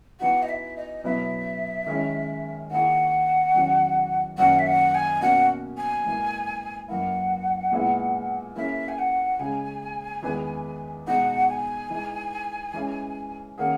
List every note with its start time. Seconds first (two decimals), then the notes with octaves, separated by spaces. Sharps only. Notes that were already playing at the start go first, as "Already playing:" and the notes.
0.20 E3 B3 D#4 F#4 F#5
0.42 D#5
0.48 E5
0.76 D#5
1.04 B2 F#3 B3 E4 E5
1.87 D#3 G#3 C#4 E4
2.70 D#3 A#3 E4 G#4 F#5
3.54 E2 D#3 F#3 C#4 F#4
4.37 F#2 D#3 F#3 A#3 C#4 F#5
4.58 E5
4.66 F#5
4.94 G#5
5.21 B2 A#3 C#4 F#4 F#5
5.77 G#5
6.05 G#2 E3 A#3
6.88 F#2 E3 A#3 E4 F#5
7.72 A#2 G#3 B3 E4
8.56 E3 A#3 C#4 E4 G#4 E5
8.88 G#5
8.98 F#5
9.39 C#3 G#3 C#4 G#5
10.23 E2 D#3 G#3 B3
11.07 B2 G#3 D#4 F#5
11.48 G#5
11.90 E3 G#3 D#4
12.73 E3 G#3 C#4 E4
13.58 D#3 A#3 C#4 G#4 F#5